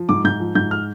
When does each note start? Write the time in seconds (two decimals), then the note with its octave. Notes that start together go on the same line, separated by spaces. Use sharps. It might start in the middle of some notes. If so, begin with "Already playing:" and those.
Already playing: F3
0.09 G#2 D6
0.25 G#2 G6
0.40 F3
0.55 G#2 G6
0.71 F6